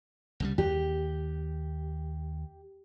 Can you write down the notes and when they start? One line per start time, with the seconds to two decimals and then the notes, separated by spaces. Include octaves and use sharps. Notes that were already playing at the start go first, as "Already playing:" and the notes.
0.40 C2 C#3 G3
0.58 D#2 G4